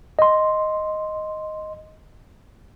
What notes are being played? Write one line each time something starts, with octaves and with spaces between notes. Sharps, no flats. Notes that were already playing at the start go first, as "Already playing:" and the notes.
D#5 C6